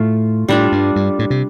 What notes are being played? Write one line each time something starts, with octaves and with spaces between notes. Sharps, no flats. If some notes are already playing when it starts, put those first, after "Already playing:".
Already playing: A2 A3 F4
A2 G3 D4 F4
G2
G2
A2
C3